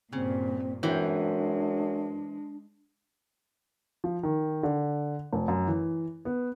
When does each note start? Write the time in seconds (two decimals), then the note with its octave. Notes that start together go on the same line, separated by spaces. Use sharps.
0.13 G2 A#2 C#3 C4
0.83 F#2 E3 G#3 C4 D4
4.04 F3
4.23 D#3
4.63 D3
5.33 F1
5.48 F#2
5.67 E3
6.25 B3